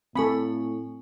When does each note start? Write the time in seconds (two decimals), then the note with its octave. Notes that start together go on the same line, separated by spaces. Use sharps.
0.16 A2 C4 A4 G#5 B5 C#6